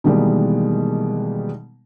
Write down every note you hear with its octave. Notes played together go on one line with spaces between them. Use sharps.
B2 D#3 E3 G3 G#3 A#3